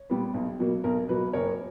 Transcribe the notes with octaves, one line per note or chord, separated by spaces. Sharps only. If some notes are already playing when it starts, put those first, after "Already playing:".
Already playing: C#5
A#2 G3 B3
B1
B2 F#3 A#3
B1 A#4
B2 F#3 A#3 B4
F#1 A#4 C#5